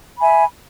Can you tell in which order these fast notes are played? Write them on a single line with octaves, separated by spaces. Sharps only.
B5 G#5 E5